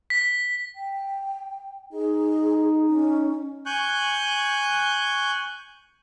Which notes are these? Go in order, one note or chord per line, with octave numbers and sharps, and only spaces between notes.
B6
G5
D#4 G#4
C#4
G#5 C#6 F#6 G6